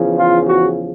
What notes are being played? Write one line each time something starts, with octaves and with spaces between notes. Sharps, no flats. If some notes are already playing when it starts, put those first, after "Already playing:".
Already playing: E2 C#3 F3
F4
F#4